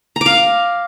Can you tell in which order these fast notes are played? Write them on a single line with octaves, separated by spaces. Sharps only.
A#5 D6 F5